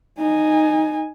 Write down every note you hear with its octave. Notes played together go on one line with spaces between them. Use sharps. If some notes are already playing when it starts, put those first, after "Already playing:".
D#4 G#5